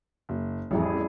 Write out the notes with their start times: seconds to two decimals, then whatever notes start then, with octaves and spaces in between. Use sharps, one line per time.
0.29 F#1
0.71 A1 F2 G3 E4 G#4